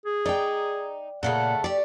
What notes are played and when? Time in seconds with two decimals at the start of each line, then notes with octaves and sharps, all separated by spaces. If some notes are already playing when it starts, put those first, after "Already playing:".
0.06 G#4
0.26 D#4 D5 G5
1.23 A#2 C#3 A3 A4 F#5
1.64 A3 G4 D5